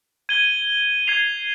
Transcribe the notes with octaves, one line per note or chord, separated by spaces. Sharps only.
G#6 D#7 G7
G#6 C7 F7